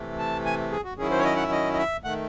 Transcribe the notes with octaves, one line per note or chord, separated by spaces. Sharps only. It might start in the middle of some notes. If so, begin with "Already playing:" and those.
Already playing: C3 E3 A3
A5
G#5
G#4
F#4
D#3 F#3 C#4 E4 G#4
C5
C#5
D#5
F#5
E5
D#5
D#5
E5
D#3 A3 F#5